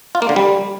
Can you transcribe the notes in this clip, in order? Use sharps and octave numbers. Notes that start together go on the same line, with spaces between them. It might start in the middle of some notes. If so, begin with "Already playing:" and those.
F4
A#3
D3
G3